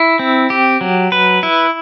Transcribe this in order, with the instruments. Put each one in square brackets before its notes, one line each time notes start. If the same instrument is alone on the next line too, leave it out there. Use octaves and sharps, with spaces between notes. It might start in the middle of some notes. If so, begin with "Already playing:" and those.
Already playing: [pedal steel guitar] E4
C4
G4
F#3
B4
E4